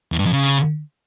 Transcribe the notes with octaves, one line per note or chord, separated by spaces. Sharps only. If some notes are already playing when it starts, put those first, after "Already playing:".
E2
G2
F2
C#3